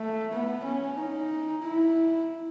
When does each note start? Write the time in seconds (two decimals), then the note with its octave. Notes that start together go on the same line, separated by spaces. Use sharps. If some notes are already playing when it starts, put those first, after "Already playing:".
Already playing: A3
0.32 B3
0.64 C#4
0.97 D#4
1.63 E4